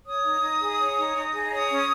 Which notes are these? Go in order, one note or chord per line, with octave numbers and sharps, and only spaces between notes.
C#5 D#6
D#4
D#4
G#4
C#5
D#4
D#4
G#4
C#5 D#6
C#4